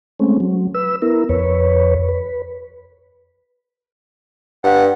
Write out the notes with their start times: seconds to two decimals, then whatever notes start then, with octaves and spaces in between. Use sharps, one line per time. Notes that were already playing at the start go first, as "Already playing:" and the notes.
0.19 G#3 A3 C4 C#4
0.40 F#3
0.74 B4 E6
1.02 B3 E4 A#4
1.29 F2 B4 C#5
2.09 B4
4.64 G2 F#5